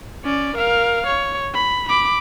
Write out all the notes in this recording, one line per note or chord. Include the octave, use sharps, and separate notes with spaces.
C#4 D5
A#4 F5
C#5
B5
B5 D6